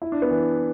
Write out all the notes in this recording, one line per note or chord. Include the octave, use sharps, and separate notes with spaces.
E4
D4
B3
E3